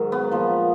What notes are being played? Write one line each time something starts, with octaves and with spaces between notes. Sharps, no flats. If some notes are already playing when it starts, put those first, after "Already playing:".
Already playing: G#2 D#3 F#3
B3
A#2 F3